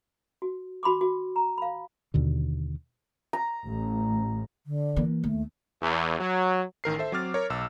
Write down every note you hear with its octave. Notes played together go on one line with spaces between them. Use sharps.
F#4
F#4 B5 C6 D6
F#4
A#5
F5 B5
D#2 B2 D3
A#5
A1
D3
E3 A#3
D#2 A3
E2
F#3
A1 D#3 A#4 C7
A4 C5 E5
F#3 C4 D6 F6 A6
A#4 C#5
B1 E6